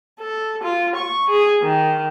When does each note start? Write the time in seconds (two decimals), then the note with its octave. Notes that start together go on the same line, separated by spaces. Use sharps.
0.20 A4
0.63 F4
0.95 C#6
1.30 G#4
1.63 D#3